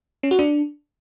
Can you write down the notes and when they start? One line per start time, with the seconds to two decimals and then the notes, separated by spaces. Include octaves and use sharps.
0.23 C#4
0.31 F#4
0.39 D4